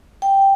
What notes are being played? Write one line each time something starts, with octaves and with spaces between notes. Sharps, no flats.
G5